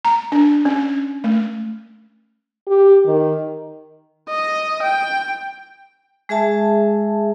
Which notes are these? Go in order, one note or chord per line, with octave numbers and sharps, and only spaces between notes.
A#5
D4
C#4
A3
G4
D#3
D#5
G5
G#3 G#4 E5 A5